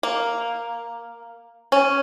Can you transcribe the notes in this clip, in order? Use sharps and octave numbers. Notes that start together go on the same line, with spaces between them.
A#3
C#4